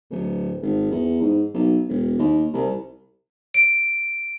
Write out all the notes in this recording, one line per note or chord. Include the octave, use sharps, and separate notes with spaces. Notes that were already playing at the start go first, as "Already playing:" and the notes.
D1
G#1
E2
G#2
B1
E1
D#2
C2
D7